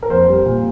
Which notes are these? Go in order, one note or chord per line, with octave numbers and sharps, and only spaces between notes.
A#4
F2 C5
G3
A#2